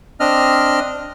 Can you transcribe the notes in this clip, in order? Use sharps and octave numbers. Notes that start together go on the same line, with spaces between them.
C4 D4 D#5 F6